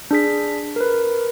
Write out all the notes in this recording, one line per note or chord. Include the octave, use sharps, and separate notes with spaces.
D4 G#4 B6
A#4 B4